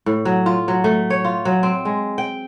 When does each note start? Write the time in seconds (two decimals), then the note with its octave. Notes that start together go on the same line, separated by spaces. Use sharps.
0.06 A2
0.25 F#3
0.46 F4
0.68 F#3
0.84 A3
1.10 C#5
1.24 F4
1.45 F#3
1.63 C4
1.85 G#3
2.18 G5